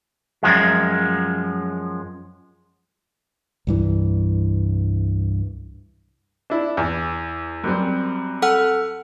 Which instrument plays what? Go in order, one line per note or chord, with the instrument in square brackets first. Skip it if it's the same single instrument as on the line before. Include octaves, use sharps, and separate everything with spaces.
[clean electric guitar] F#2 F3 G#3
[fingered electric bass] C2 G2 E3
[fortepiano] D4 E4
E2
F#2 G3 C4
[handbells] A4 F#5 F6